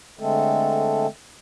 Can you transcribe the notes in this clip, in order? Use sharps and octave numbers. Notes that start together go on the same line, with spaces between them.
D3 G#3 A3 C4 A4